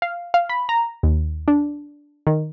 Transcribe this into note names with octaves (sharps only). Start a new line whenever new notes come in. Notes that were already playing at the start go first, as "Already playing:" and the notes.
F5
F5
B5
A#5
D#2
D4
D#3